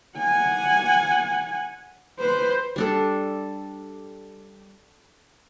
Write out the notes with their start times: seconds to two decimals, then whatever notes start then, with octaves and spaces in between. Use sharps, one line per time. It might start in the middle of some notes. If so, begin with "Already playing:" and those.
0.18 F#5 G#5
2.19 B4 C5
2.76 G3 D4 A4